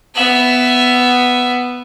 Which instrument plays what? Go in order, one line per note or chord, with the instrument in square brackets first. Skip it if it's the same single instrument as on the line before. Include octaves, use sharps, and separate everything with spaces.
[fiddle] B3 E5